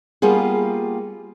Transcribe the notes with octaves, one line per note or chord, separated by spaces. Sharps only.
G3 A#3 B3 F4 G#4